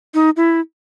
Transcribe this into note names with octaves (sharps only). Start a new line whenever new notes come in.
D#4
E4